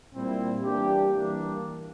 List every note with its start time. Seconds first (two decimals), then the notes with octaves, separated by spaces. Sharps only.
0.13 A#2 G3 C4 E4
0.63 E3 G3 A#3 D4 G4
1.14 E3 G3 A#3 D4